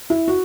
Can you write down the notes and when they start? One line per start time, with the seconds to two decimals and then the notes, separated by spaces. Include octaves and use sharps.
0.10 E4
0.28 F#4